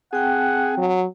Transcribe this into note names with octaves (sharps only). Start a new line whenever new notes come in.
C4 G#4 F#5 G5 A5
F#3